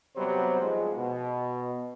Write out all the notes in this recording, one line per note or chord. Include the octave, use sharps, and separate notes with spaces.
C3 F#3 G3 B3 C5
G#2 F3 G#3
B2